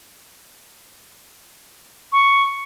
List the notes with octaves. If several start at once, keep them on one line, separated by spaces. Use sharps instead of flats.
C#6